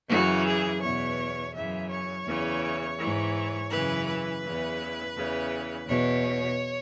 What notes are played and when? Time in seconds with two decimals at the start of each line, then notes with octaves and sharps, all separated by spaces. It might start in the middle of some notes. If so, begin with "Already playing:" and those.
0.09 F#2 C#3 E3 F#4
0.46 G#4
0.82 E2 B2 C#5
1.53 F#2 C#3 E3 E5
1.90 C#5
2.26 E2 C#3 E3
2.98 G#2 E3
3.70 F#2 C#3 E3 B4
4.07 B4
4.43 E2 C#3 E3
5.15 E2 C#3 E3
5.87 E2 B2 C#5